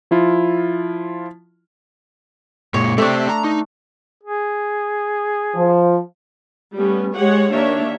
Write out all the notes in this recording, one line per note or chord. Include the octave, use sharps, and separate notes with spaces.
F3 E4 F4
A#2 G#3 C#5
A3 C4 D4 G4 C5
A#5
D#4
G#4
F3
G3 A3 B3 C#4
G#3 G4 G#4 C#5 F#5
D#3 A#3 D4 G4 C#5 E5